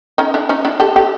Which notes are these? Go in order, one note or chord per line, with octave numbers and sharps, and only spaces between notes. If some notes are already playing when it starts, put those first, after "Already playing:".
C#4 D#4
D4 E4
C#4 D#4
D4 E4
G4 A4
G4 A4